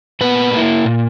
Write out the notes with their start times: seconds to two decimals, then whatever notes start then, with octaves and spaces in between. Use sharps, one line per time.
0.21 A#2 B3 B4
0.54 A#3 E4
0.85 A#2